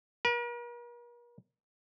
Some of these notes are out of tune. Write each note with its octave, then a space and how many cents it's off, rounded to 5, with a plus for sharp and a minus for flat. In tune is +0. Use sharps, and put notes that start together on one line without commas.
A#4 +45